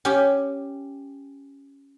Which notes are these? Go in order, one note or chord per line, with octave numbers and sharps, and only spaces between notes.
C#4 G4